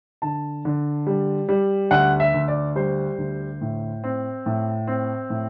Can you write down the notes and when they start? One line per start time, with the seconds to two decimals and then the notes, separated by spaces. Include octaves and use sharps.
0.22 D3 A5
0.65 D3
1.07 G3
1.49 G3
1.91 D2 F#5
2.20 E5
2.34 D2
2.48 D5
2.76 G3 C5
3.18 D2
3.61 A2
4.04 C4
4.46 A2
4.87 C4
5.30 A2